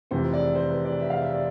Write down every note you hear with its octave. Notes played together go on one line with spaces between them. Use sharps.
F1 F2 E3 C5
D5
C5
B4
D5
E5
F5
E5
D5